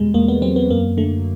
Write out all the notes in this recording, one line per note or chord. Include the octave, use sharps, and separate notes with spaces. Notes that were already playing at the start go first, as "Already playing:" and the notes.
Already playing: E2 B2 G3 G#3
E2 A#3
B3
F#3 C4
B3
F#2 A#3
D3 A3